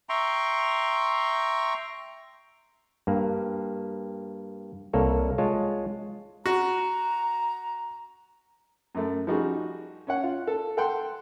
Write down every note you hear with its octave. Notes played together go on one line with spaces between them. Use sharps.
E5 G5 A#5 C6 C#6
G2 A#3
C2 A#3 A4 C#5
G#3 F4 C#5 A5
F#4 A#5
F#2 A3
F3 G3 D#4 F#4 G#4
C#4 C#5 F#5
F4
A4
A4 F#5 G5 C6